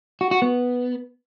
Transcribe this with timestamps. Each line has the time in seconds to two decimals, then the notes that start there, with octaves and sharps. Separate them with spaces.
0.21 F#4
0.31 F#4
0.42 B3